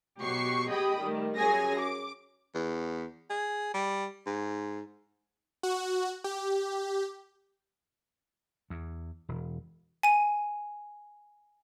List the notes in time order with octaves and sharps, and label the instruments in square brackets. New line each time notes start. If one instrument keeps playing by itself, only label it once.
[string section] B2 F#3 F#4 G4 C#6 C7
G4 G#4 D#5 G5 B5 D#6
D#3 G3 A3
F#2 G#4 C#5 G#5 A#6
D6
[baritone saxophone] E2
G#4
G3
G#2
[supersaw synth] F#4
G4
[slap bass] E2
E1
[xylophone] G#5 D#7